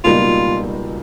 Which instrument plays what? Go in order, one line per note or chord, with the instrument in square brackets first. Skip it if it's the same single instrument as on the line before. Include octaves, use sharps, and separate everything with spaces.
[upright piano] C#2 B2 G3 A#3 D#4 [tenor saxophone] F4